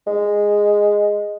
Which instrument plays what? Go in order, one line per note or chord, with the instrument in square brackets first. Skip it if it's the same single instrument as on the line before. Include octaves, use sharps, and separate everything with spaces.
[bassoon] G#3